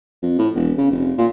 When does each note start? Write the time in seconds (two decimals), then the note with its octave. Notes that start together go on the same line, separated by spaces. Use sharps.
0.22 F2
0.38 A2
0.55 E1
0.78 C#3
0.91 F1
1.18 A#2